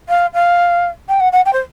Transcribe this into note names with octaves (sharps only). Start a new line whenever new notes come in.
F5
F5
G5
F#5
F#5
G5
C5